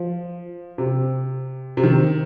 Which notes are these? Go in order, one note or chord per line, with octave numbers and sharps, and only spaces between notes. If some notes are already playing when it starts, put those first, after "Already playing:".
Already playing: F3
C3
C3
D#3